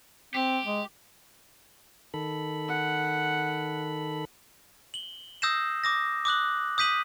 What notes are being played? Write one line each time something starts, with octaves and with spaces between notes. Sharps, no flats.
C4 G4
G#3
D#3 A4 B5
F#5
F#7 G7
D#6 E6 G6 A#6 C7 E7
D6 D#6 A#6
D6 D#6 F#6 F#7
D#6 G6 B6 D#7 F#7